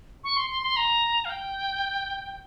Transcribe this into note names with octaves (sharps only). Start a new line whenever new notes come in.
C#6
C6
C6
C6
A#5
F5
G5